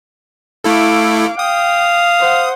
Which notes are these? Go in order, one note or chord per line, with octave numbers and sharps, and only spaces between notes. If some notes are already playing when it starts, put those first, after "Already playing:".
A3 E4 A4 F5 D6
F5 G5 D#6
C5 F#5